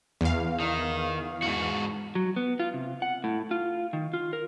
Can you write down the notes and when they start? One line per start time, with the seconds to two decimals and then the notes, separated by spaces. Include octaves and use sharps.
0.21 E2 F5
0.60 D#3
1.42 G#2 F#4
2.15 F#3
2.36 B3
2.60 F4
2.74 C3
3.02 F#5
3.24 A2
3.51 F4
3.93 D#3
4.14 F4
4.33 A#4